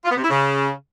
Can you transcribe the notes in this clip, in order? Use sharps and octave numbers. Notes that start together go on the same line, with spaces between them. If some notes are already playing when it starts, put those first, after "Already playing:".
F4
B3
C3
E4
C#3